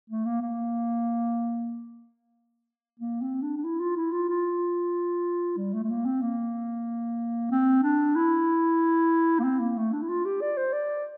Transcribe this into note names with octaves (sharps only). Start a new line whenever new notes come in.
A3
A#3
A#3
A#3
C4
D4
D4
E4
F4
E4
F4
F4
G3
A3
A3
A#3
C4
A#3
C4
D4
E4
A#3
C4
A#3
A3
D4
E4
F4
G4
D5
C5
D5